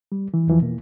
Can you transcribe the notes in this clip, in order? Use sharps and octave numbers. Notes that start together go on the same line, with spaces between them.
G3
E3
E2 E3 F3
B2 A#3